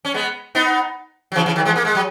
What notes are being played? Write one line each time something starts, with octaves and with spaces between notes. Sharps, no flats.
C#4
G#3 B3
B3 D#4
F#3
C#3 E3
C#3 E3
D#3 F#3
E3 G#3
A#3
G#3
F#3